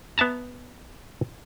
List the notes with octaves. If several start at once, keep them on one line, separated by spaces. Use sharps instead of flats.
B3 E5 A5 A#5